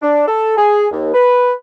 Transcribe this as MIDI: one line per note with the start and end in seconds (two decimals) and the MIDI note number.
0.02 0.25 62
0.27 0.56 69
0.57 0.86 68
0.91 1.13 39
1.14 1.52 71